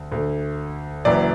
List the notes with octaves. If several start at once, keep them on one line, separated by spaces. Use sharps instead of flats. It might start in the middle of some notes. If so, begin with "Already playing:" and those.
Already playing: D2
D2 D3
F#1 F#2 E3 D5